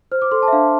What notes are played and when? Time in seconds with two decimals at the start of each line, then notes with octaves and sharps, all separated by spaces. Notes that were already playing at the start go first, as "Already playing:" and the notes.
0.12 C5 F6
0.22 D6
0.31 A4 C6
0.43 A5
0.48 E5
0.52 D4 F5